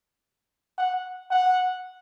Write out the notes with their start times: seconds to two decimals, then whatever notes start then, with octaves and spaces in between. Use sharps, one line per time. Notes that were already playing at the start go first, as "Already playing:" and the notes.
0.78 F#5
1.31 F#5